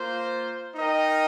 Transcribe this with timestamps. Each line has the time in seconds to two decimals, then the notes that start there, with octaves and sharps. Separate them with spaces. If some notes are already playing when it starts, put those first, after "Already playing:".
Already playing: A#3 F4 C5
0.75 D#4 A#4 D#5 G5